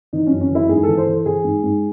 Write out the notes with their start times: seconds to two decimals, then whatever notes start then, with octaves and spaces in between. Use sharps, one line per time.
0.13 E3 D#4
0.27 F#2 C#4
0.41 C#4
0.50 E3 E4
0.69 G#2 G#4
0.83 A4
0.88 E3
0.98 C5
1.06 E3 A4
1.26 E3 G#4
1.44 G#2
1.63 G#2